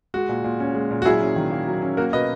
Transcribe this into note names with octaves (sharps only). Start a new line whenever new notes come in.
G#3 F#4
A#2
A#2
C#4
G#3
A#2
F#4
F#3 E4 G#4
C#4
D#3
A#3
F#3
C#4
A#3 F#4 A#4
B2 B4 D#5